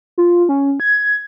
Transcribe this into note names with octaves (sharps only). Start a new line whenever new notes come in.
F4
C#4
G#6